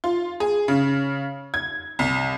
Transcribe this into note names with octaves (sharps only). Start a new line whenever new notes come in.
F4
G#4
C#3
G#6
C2